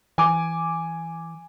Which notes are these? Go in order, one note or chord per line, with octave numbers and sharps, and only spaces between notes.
E3 G#5 D6